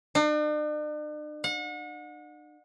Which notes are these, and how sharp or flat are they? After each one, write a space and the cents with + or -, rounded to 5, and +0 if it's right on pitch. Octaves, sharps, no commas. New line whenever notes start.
D4 +45
F#5 -35